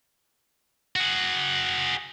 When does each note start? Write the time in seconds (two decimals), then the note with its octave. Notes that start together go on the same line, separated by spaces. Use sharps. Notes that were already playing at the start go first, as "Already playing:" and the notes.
0.96 F#4 G#4